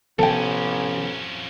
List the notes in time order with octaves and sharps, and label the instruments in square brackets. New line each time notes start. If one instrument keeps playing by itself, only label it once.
[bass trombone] A1 [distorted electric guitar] F2 C#4 [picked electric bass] C3 F3 B3 [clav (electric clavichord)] A4 G5